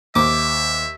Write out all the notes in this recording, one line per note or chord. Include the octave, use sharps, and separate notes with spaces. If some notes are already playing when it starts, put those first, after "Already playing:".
D#2 C5 E5 D6